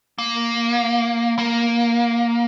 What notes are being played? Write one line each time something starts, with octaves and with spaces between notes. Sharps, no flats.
A#3
A#3